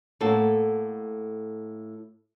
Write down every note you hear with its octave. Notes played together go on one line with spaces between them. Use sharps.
A2 A#3 F#4 A4